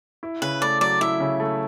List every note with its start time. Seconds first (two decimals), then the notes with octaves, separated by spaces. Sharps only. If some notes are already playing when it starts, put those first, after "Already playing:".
0.23 E4
0.42 C#3 B4
0.61 A3 D5
0.81 F#3 D5
1.01 E4 E5
1.20 C#3
1.40 A3